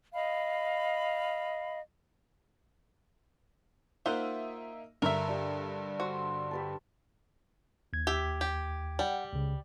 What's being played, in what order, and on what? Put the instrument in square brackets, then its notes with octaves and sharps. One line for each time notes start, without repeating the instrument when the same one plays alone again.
[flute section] D#5 F5 B5
[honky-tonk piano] A#3 D#4 E5 [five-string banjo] F4 C5 F#5
[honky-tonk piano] G2 D3 [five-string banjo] A#4 E5
[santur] D4 G4
[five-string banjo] F#4 [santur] C5
[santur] G4 B4 A5
[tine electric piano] D#2 G#6
[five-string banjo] G4 E5
G4
[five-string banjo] G3 [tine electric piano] D5 F#5 G5
[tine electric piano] C#2 C#3